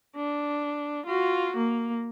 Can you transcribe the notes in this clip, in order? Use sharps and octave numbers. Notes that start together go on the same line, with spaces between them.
D4
F4 F#4
A#3